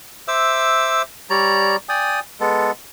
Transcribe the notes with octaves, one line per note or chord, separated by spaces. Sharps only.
C5 E5 D6 E6
G3 C#5 D5 A#5
D5 G5 G#5 D#6
G#3 B3 A4